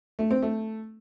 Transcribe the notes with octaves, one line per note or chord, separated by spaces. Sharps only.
A3
C4
A3